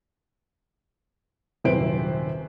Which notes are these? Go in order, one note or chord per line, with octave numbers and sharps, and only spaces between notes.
D#1 F#2 C3 B4 C5 D7